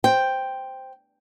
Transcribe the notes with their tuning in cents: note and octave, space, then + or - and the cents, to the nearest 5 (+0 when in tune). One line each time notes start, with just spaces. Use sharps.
C5 +0 G5 +0